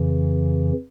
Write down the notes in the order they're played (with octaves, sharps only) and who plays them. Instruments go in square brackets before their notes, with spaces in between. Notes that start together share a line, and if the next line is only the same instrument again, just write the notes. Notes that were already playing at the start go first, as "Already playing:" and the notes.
Already playing: [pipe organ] F2 C#3 E3